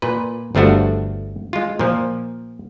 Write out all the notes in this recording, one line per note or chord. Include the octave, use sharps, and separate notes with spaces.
A#2 B4
G1 F3 A3 D4 F#4
G#3 F4
A#2 F3